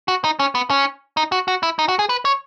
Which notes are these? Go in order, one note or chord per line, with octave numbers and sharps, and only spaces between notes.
F#4
D#4
C#4
B3
C#4
D#4
F#4
F#4
E4
D#4
F#4
G#4
B4
C#5